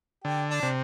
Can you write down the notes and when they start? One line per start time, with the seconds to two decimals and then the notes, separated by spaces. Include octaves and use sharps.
0.24 D3 G4
0.50 D4
0.63 C3